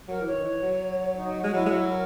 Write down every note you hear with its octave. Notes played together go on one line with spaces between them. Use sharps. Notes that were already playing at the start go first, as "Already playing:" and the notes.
F#3 A#4
E3
C#5
D#3
E3
F#3
D#4
G#3 F#4
F#3 E4
G#3
F#3
A#4